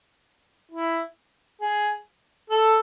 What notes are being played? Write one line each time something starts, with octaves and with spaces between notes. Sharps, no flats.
E4
G#4
A4